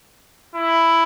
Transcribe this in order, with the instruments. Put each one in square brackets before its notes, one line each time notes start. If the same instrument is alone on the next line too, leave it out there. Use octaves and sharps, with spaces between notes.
[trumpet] E4